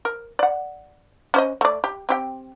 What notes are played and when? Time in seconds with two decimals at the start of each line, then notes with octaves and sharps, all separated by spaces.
0.05 A#4
0.39 D5 F#5
1.34 C#4 C5 D#5
1.61 A3 D5
1.84 G4
2.09 C4 G4 G5